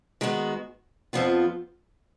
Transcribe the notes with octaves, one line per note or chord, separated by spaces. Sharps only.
D#3 G#3 B3 F#4
F2 F3 B3 F4